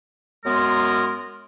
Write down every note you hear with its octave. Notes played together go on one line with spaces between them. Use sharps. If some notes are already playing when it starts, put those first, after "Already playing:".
F#2 G#3 B3 A#4 C6